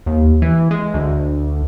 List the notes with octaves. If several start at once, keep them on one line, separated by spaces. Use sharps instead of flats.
D#2
E3
G#3
D2